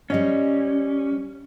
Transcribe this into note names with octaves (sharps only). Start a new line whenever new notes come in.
G3 C#4 D#5 F5